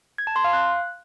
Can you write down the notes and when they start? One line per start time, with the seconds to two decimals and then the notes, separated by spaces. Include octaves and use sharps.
0.18 G#6
0.27 A5
0.36 C6
0.44 F5
0.53 F#6